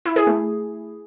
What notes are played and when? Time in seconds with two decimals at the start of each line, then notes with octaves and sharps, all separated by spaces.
0.05 E4
0.16 G#4
0.27 A3